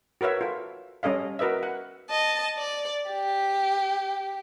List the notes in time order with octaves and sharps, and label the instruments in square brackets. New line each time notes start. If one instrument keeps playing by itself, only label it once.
[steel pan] F#4 A#4 B4 C#5 E5
F4 A4
G3 C#4 A4 D#5 F5
F#4 A#4 B4 D#5 E5
F#5
[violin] D#5 A5
D5
G4